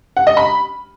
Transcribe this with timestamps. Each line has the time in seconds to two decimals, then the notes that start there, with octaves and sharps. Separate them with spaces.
0.17 F#5
0.27 D#5
0.37 B5